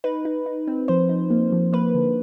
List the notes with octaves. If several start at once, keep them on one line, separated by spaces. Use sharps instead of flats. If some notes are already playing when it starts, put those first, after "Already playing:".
D#4 B4
D#4
D#4
C4
F3 C5
D#4
A#3
F3
A#3 B4
D3